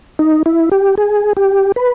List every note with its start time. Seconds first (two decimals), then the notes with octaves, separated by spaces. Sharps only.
0.19 D#4
0.46 E4
0.72 G4
0.98 G#4
1.37 G4
1.76 B4